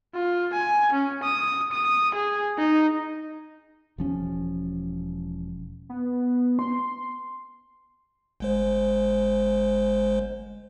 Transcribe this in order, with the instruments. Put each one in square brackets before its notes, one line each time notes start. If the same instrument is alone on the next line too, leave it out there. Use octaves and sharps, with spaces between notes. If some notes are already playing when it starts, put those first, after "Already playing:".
[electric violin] F4
G#5
C#4
D#6
D#6
G#4
D#4
[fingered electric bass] E1 F3 C#4
[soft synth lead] B3
C6
[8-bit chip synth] G1 G#3 C5